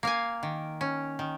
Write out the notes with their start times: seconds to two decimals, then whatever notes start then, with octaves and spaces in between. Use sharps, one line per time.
0.03 A#3 F5 G#5
0.43 D#3
0.81 C#4
1.19 D#3